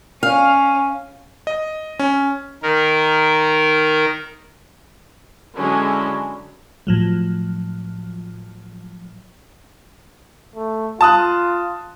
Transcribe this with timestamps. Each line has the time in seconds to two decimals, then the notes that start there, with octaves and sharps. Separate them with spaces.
0.23 C#4 F5
1.47 D#5
1.99 C#4
2.63 D#3 A#4
5.58 D3 F#3 G#3 C#4 D4 E4
6.87 A2 F3 F#3
10.56 A3
11.01 F4 A5 D#6 F#6